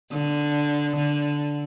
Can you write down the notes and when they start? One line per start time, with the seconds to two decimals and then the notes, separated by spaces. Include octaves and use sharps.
0.12 D3
0.96 D3